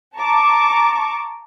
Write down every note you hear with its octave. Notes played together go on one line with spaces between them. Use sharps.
A5 A#5 C#6 D6